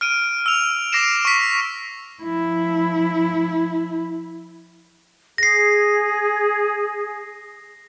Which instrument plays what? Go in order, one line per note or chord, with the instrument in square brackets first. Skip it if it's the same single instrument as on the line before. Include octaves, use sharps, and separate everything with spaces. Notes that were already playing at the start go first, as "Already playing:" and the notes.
[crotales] F6 D7 D#7
E6 F7
D6 A#6 C7 D7 E7
C#6 B6
[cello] F3 E4
[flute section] G#4 [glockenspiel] A#6 C7